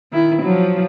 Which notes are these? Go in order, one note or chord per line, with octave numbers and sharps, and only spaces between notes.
D#3 E4
F3 F#3